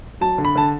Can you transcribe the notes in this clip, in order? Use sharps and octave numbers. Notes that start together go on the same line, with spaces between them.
F#3 A5
D3
B5
D3 A5